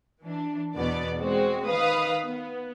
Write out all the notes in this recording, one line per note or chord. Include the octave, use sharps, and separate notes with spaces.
E3 D4
E2 B2 B3 D5
G#3 C4 F#4
D#3 B4 F5 D#6
B3